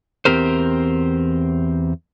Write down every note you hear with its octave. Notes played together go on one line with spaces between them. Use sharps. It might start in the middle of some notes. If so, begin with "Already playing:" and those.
E2 A#2 C4 G4 A#4 C5